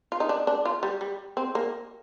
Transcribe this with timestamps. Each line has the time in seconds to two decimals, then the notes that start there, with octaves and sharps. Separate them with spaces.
0.12 F4
0.20 D#4
0.29 D4
0.47 D4
0.65 F4
0.83 G3
1.01 G3
1.37 C4
1.55 A#3